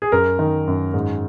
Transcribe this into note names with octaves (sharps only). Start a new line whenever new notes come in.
G#4
F#2 A#4
D#3
F#2
G#2